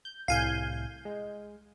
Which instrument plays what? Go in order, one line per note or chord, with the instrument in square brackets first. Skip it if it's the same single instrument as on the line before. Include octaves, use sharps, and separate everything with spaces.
[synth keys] G6
[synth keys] C2 A2 [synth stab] F5 G#5 G6
[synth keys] G#3